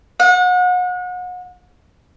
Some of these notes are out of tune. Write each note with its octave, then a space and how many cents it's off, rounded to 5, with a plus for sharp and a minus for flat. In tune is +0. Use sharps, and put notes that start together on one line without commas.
F#5 -35